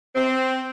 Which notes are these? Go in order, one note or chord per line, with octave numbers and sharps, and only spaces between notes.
C4